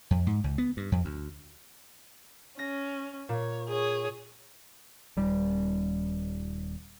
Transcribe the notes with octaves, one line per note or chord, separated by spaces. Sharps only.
F2
G#2
C#2
B3
G2
F2
D2
C#4 A#6
A#2 C#5
G#4 C#5
D#1 G3